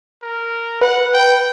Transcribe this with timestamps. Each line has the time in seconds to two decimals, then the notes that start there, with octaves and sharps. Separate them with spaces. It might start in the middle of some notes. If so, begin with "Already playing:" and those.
0.23 A#4
0.81 B4 F#5
1.14 G5